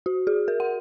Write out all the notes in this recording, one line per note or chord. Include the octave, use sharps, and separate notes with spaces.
F#4
G#4
A#4
F#5